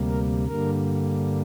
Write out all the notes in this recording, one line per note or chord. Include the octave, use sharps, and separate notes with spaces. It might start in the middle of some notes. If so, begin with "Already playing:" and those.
Already playing: D2 C3 G3 A#3
A#4
G2 D3 G3 A#3 A#4